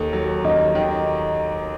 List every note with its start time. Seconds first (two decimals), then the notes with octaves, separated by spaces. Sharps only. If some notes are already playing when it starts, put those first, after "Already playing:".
Already playing: D#2 D#3 A4
0.13 F#3
0.44 D#2 D#5
0.75 D#3